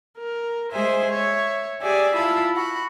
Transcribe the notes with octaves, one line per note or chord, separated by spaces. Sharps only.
A#4
G#3 G#4 C5 E5 G#5
C#5 E5
G4 G#4 D5 E5 G#5
E4 F4 E5 A5 B5
F#4 B5